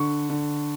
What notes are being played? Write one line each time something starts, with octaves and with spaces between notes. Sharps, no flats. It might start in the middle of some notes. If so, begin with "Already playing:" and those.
Already playing: D3 C#6
D3